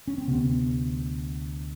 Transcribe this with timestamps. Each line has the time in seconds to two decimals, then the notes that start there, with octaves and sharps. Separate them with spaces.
0.08 C#4
0.18 C4
0.28 D2 C3 B3